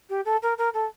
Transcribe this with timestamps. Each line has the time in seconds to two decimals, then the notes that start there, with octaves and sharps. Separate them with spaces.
0.09 G4
0.25 A4
0.42 A#4
0.58 A#4
0.74 A4